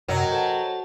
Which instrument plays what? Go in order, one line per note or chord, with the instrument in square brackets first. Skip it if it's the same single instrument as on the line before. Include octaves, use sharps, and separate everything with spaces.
[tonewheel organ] F#2 C3 [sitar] F#3 [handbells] A#4 D#5 G5
[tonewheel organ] A4 [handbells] C5 A5